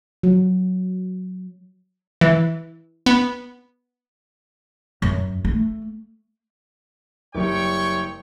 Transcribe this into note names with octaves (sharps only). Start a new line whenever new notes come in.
F#3
E3
B3
F#2
A3
F#1 G3 C#5 G5 C#6